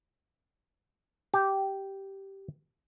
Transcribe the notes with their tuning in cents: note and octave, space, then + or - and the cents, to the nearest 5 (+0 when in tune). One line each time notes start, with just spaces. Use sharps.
G4 -10